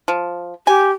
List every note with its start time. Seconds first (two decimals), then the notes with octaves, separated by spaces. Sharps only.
0.08 F3
0.67 G4 G#5